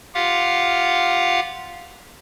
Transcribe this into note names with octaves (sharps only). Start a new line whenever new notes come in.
F4 G4 F5 F#5